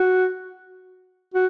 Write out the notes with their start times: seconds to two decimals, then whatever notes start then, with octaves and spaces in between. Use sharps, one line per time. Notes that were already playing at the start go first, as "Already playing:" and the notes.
Already playing: F#4
1.34 F#4